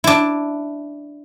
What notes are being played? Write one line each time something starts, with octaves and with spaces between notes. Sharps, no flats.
D4 E4